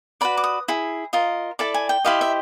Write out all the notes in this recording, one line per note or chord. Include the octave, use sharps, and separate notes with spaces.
F#4 B4 D5 B5
D6
D#6
E4 G#4
F4 A#4 D#5
E4 A4 D5 A5
G#5
G5
E4 G4 C5 D#5 F5
E5